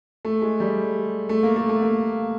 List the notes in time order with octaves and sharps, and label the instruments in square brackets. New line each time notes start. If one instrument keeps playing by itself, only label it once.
[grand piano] A3
G#3
G3
A3
A#3
A3
A3
A#3